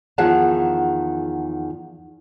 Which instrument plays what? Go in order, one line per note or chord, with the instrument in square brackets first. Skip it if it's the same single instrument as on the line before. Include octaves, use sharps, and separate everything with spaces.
[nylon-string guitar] E2 D#3 F3 G#4 F#5 A5